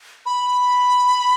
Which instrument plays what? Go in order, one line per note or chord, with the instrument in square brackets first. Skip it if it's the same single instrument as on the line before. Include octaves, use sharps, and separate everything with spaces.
[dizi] B5